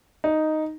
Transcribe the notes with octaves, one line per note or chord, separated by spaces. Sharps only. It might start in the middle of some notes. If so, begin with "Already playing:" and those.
D#4